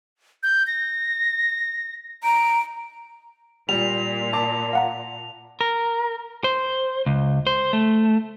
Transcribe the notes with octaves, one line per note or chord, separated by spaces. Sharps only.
G6
A#6
A#5 D7
A#2 G3 F7
A5 D6
F5 F#5 A#5
A#4
C5
C#2
C5
A3